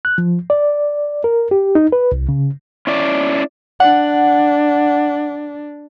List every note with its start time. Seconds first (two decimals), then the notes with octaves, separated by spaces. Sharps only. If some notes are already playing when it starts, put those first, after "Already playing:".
0.05 F#6
0.18 F3
0.50 D5
1.24 A#4
1.51 G4
1.75 D#4
1.92 B4
2.12 C2
2.29 C#3
2.87 C#4 E4 D5
3.80 D4 F#5